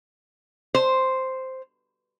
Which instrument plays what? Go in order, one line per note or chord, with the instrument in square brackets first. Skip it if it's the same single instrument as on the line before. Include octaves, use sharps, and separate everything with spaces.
[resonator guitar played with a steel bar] C5